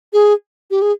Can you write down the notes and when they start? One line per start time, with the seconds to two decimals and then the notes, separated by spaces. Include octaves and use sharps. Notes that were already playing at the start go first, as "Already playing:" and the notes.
0.13 G#4
0.71 G4
0.82 G#4